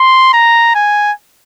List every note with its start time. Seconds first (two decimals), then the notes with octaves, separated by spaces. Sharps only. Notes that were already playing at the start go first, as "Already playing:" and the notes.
Already playing: C6
0.33 A#5
0.75 G#5